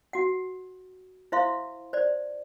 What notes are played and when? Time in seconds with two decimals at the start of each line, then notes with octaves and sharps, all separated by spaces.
0.13 F#4 F#5
1.32 E4 C5 E5 F5 C6
1.93 C5 D5